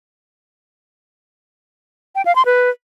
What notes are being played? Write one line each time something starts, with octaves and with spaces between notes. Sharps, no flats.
G5
F5
C6
B4